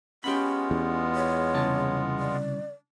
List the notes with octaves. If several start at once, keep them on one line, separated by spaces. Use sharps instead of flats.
G#3 B3 C#4 F4 G4 B5
E2
C#5
C2 C#3 A5
D5